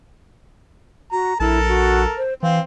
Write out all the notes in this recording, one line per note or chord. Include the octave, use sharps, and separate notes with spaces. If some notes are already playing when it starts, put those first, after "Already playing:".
F#4 A#5
A#1 E4 A4 A#4 A5
F#4
C5
E3 C4 F5